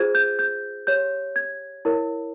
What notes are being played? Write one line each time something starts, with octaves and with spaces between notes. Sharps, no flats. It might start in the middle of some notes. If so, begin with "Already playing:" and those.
Already playing: F4 G#4 C5 G#6
G6
G6
G4 C#5 G6
G#6
E4 A#4 C#5